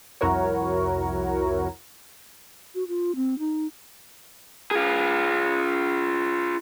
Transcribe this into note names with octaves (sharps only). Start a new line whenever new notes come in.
C2 F2 E4 F#4 A#4 C#5
F#4
F4
C4
D#4
F4 G#4